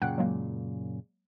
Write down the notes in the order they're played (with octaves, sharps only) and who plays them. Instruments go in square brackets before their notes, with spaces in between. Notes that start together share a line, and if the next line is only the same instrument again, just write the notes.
[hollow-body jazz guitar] F#2 A#2 C#3 [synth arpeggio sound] F#5 G5 F#6
[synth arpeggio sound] F#3 G#3 A#3